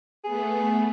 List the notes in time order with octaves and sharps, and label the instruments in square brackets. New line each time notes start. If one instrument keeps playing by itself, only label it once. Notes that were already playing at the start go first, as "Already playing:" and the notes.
[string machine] A3 B3 [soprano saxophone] G#4